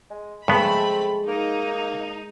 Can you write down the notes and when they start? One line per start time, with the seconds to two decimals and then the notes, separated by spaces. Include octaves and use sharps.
0.10 G#3
0.48 G2 G#3 A3 B3 C4 B5
1.28 A#3 D#4